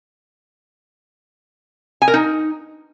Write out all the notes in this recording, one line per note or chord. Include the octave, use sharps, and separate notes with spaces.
G#5
A#4
D#4